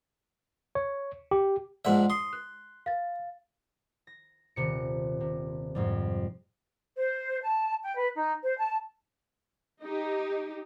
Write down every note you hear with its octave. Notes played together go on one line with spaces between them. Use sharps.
C#5
G4
A#1 G#2 D5 E5 F#5 C6
C6 D#6 C7
F#6
F5 A6
A#6
D#1 C3 C#7
C3
F2 G#2 G3
C5
A5
G5
B4
D#4
C5
A5
D#4 G4